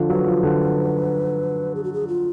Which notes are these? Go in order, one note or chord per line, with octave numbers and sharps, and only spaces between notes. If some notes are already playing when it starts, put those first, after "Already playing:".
Already playing: D3 F3
F#3 B4
F3
D3
G#4
F#4
G#4
F4